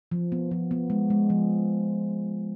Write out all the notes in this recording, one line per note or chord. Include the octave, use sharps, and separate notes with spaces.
F3
B3
F3
B3
G#3
G#3
F3